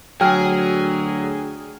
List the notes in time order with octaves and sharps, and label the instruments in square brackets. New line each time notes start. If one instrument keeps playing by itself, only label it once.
[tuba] D2 [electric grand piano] F#3 [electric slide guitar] G#4 G#5 [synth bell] G5 F6